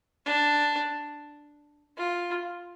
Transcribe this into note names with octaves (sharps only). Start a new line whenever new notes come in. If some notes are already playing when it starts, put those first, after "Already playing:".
D4
F4